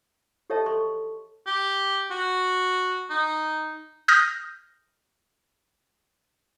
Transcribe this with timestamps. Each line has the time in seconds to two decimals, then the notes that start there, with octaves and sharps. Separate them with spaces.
0.50 G4 A4 C#5 D#5 E5 A5
0.66 A4 C6 C#6
1.47 G4
2.11 F#4
3.10 D#4
4.08 D#6 F6 G6 A#6